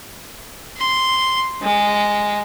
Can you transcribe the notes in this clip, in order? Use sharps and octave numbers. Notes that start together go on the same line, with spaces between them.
C6
G#3